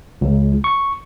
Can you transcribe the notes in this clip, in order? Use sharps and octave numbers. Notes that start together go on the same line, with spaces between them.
C#2
C#6